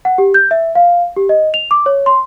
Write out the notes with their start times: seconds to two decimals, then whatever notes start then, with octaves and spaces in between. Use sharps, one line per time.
0.05 F#5
0.18 G4
0.34 G6
0.51 E5
0.75 F5
1.17 G4
1.29 D#5
1.54 F7
1.71 D6
1.86 C#5
2.06 C6